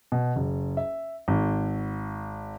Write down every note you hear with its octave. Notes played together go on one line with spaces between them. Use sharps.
B2
F#1
E5
G#1